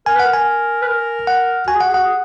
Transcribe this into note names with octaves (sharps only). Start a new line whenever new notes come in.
A#4 G#5
B4
A#4 F#5
G#5
B4
A#4
F#5
F#4 G#5
G#4
F#4 F#5
G#4
F#4 F#5
G#4